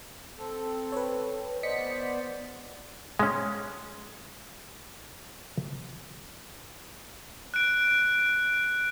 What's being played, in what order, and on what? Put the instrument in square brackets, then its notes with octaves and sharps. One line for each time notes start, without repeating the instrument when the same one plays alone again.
[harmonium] C4 A4
[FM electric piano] B4 C#5
[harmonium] B3 C5 D5 [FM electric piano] D#5 B6 C#7
[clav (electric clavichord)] G#3 C#4
[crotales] F#6 D7